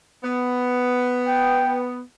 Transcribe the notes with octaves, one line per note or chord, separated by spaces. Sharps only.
B3
G5